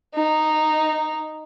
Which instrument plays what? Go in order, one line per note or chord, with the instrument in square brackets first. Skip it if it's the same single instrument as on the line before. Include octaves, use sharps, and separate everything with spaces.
[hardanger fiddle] D#4